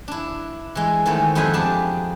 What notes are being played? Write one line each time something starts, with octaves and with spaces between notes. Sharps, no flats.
D4 E4
E3 G#3
D#3 E3 G#3 A3 B3 C5
F2 B3 G#4 C5 E5 G#5
B3 D4 G4 G#4 D5 A5